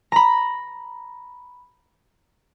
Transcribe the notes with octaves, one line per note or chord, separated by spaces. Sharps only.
A#5 B5